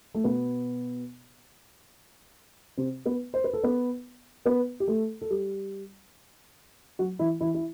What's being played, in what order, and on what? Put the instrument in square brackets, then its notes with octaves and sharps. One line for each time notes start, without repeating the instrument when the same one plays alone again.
[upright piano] A3
B2 B3
C3 C4
B3 B4
C5
B4
A4
B3 B4
B3 B4
G4
A3 A4
A4
G3 G4
F#3 F#4
E3 E4
E3 E4
E4